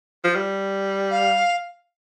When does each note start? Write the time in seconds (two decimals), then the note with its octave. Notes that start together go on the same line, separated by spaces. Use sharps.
0.24 F3
0.35 G3
1.10 F5